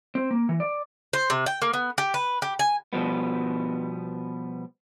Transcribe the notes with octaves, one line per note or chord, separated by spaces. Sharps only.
C4
A#3
E3
D5
C5
C3
G5
A#3
B3
G4
B4
G4
G#5
B2 F3 G3 B3